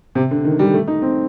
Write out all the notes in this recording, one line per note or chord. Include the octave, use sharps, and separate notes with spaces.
C3
D3
D#3
G3
A3
D#4
C4